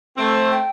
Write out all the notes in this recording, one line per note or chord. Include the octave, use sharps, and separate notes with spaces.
A3 C4
G5